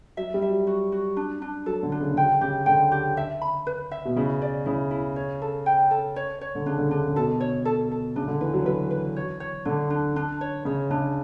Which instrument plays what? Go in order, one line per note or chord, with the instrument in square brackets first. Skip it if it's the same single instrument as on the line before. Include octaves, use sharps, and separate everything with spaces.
[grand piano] F#3 [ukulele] E5
[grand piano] G3
[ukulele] E5
[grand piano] F#3
[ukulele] F#4
F#4
D4
D4
[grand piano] F#3 [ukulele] A4
[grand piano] D3
[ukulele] D4
[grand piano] C#3
D3
[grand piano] C#3 [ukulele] G5
[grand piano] C#3 [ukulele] G4
[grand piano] D3 [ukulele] G5
[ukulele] G4
E5
B5
B4
E5
[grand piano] B2
[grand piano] C#3 [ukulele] E4
[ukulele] D5
[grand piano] C#3 [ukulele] E4
[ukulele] E4
C#5
A4
G5
A4
C#5
C#5
[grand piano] D3
[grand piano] C#3 [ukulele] D4
[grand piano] D3
[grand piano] C#3 [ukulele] D4
[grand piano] C#3
[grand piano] B2 [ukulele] A4
[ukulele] C#5
A4
A4
[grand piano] C#3 [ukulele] D4
[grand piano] D3
[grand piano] E3 [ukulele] B4
[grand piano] F#3
[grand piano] F#3 [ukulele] B4
[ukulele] B4
C#5
C#5
[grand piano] D3 [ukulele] D4
[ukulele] D4
D4
C#5
[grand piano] C#3 [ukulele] C#5
[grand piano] C#3 [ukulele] D4